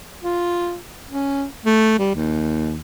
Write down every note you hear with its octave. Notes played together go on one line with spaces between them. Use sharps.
F4
C#4
A3
G3
D#2